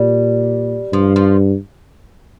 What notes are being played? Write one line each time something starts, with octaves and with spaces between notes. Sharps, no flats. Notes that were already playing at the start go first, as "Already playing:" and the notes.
Already playing: A#2 G3
G2 F3
F3